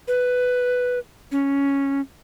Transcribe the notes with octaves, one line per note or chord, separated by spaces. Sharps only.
B4
C#4